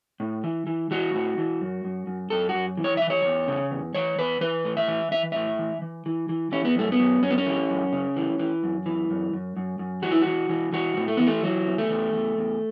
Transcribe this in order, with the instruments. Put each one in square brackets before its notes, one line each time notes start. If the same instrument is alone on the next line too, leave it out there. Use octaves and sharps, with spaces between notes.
[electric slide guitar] A2
E3
E3
E3 F#4
A2
E3
F#2
F#2
F#2
F#2 A4
F#4
F#2
E3
C#5
E3 E5
C#5
E2
C#3
E2
E3 C#5
E2 B4
E3 B4
A2
E5
E3
E3 E5
A2 E5
E3
E3
E3
E3
E3 C#4
B3
F#2 A3
B3
F#2
F#2 C#4
B3
C#4
E3
F#2
C#3
E3
E3
F#2
E3
F#2
F#2
F#2
F#2
E3 F#4
E4
E3 F#4
E3
E3 F#4
A2
A3
E3 B3
A3
E3 F#3
E2
A3
E2
E2
E2